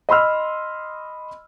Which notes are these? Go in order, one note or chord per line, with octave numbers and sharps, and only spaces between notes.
D#5 B5 C6 E6 F6